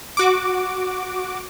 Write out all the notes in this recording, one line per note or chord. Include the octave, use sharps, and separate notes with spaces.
F#4 D6